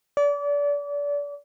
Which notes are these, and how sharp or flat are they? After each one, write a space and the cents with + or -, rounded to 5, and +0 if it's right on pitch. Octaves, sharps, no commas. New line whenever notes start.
D5 -30